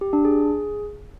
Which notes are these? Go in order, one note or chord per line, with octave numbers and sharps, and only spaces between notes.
G4
D4
G#4